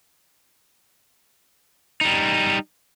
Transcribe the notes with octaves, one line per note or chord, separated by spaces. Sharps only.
G3 D#4